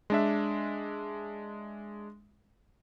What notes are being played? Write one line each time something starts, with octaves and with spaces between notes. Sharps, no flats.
G#3 D4 E5